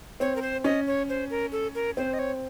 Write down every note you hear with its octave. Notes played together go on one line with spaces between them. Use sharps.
C4 C#5
A#4
C5
C#4 D#5
C#5
C5
A#4
A4
A#4
C4 C5
D#5
C#5